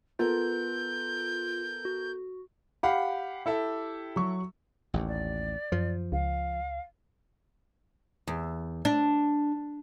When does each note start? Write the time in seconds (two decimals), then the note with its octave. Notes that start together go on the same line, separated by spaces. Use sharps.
0.19 B3 F4 A4 A#4 G6
1.85 F#4
2.83 G4 F5 F#5 B5
3.46 E4 A4 E5
4.16 F#3 C#6
4.94 A1 D#2
5.07 D5
5.72 F#2 F3
6.12 C#2 F5
8.27 E2
8.85 D4